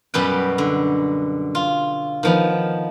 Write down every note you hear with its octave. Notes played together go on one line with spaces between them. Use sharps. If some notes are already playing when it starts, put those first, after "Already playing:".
F#2 B2 G3 B4 G5
D3
F4
D#3 F3 B3